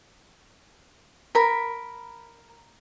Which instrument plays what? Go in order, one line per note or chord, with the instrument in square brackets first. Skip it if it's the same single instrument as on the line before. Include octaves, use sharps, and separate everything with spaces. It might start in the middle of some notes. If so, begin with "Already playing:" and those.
[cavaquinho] A#4 B5